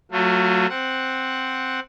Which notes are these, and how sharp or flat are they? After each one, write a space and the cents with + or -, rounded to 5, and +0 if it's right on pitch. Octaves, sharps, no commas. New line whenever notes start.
F#3 +0 A3 +30 F4 +20
C4 +0 F#5 +0